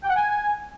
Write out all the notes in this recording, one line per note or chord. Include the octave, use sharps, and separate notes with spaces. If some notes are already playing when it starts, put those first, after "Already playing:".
G5
F#5
G#5